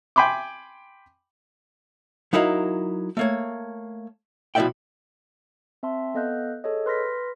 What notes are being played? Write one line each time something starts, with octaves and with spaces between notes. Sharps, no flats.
G5 G#5 B5 C6 D6
F#3 D#4 E4 A#4 F5
A3 A#3 C#5
B2 F3 E4 D5 E5 G5
C4 E5 A5 C6
B3 A4 D#5 F5 F#6 G6
G#4 A4 C#5 D#5
B4 C6 F6 A#6 B6